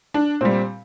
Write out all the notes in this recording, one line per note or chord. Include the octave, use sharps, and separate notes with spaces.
D4
A#2 G3 C4